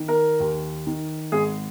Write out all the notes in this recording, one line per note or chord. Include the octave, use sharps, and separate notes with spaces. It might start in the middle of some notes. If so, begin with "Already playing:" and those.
Already playing: D#3
A#4
D#2
D#3
G#1 G#4